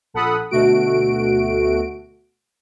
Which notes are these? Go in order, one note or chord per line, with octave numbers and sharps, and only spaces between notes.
A#1 A4 F#5 B5 D#6
D2 B2 A3 F#4 D7